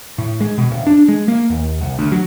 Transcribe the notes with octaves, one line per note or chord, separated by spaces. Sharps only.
A2
G#3
B2
D1
D4
G#3
A#3
D#2
C2
D2
F#3